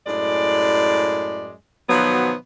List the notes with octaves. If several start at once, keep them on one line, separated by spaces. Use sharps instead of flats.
F#2 A2 G#3 D5
B2 D#3 F3 F#3 B3